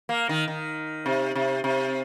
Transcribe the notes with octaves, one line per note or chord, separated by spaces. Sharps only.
A#3
D#3
D#3
C3
C3
C3